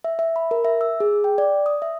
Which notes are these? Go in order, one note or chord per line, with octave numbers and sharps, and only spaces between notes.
E5
E5
B5
A#4
E5
E6
G#4
G5
D5
D#6
E5